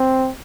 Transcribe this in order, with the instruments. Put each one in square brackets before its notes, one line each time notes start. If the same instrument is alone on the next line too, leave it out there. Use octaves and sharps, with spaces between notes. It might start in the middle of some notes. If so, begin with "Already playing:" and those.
Already playing: [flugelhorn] C4